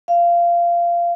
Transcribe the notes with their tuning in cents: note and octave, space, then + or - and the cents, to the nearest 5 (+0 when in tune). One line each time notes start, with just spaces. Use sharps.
F5 -20